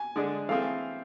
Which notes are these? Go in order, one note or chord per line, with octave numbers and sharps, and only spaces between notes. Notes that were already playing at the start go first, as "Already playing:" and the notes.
Already playing: G#5
D3 G#3 D4 G#4
E3 A3 C4 G#4 F5